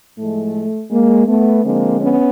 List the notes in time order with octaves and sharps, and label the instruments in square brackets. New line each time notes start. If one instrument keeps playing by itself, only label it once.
[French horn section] A2 F3 G#3 A3
G#3 A#3
A3 B3
D3 F3 G#3 A#3 C4
B3 C#4